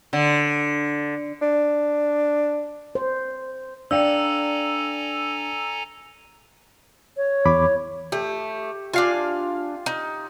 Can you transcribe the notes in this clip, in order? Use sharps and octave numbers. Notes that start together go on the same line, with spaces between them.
D3
D4
C5
D4 A4 D5 F5 G5 G#5 A#5 E6
C#5
E2 B5 D6
A3 G4
D4 F4 F5 G#5
D#4